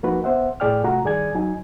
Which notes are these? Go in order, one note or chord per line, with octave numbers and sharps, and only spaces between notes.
F3 A#3 D#4 F#4 B4
B3 C5 E5 F#5
A2 G#4 D5 G5 F6
C3 A3 F4 F#4 F#5 A#5
G2 D#3 G#4 D5 G#5 G#6
F#3 D#4 G#5